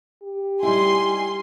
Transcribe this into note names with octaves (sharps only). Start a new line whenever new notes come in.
G4
G3 D#4 E4 G#5 C6